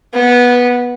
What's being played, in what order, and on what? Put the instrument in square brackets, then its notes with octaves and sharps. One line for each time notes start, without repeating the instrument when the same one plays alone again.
[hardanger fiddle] B3